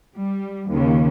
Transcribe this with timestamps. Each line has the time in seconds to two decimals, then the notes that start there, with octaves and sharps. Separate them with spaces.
0.16 G3
0.71 D#2 C#3